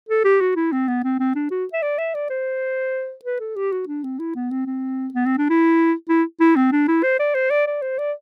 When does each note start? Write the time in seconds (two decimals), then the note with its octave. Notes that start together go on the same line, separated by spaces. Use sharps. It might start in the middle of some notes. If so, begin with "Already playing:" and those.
0.08 A4
0.24 G4
0.41 F#4
0.56 E4
0.72 C4
0.88 B3
1.04 C4
1.20 C4
1.35 D4
1.51 F#4
1.73 E5
1.82 D5
1.98 E5
2.14 D5
2.30 C5
3.25 B4
3.40 A4
3.56 G4
3.72 F#4
3.87 D4
4.03 C4
4.19 E4
4.35 B3
4.51 C4
4.66 C4
5.14 B3
5.26 C4
5.38 D4
5.49 E4
6.09 E4
6.40 E4
6.56 C4
6.72 D4
6.88 E4
7.03 C5
7.19 D5
7.35 C5
7.50 D5
7.67 D5
7.82 C5
7.98 D5